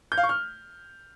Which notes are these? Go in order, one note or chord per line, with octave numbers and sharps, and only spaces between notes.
G6
F5
C#6
F6